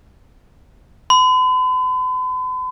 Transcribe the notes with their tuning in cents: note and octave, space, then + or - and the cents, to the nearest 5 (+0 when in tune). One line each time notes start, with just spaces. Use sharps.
B5 +45